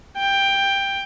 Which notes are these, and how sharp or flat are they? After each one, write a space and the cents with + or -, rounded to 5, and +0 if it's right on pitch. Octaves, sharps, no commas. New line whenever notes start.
G5 +10